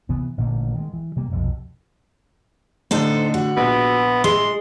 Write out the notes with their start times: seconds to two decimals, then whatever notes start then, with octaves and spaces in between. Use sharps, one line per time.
0.09 C3 E3 B3
0.38 A1 A#2 D3 A#3
0.75 D#3 G#3
0.93 E3
1.16 C3 G3 A#3
1.31 B1 F2 C3
2.91 A2 D3 D#4 A4 C5
3.34 F#4
3.57 A#1 B3
4.24 G#3 C6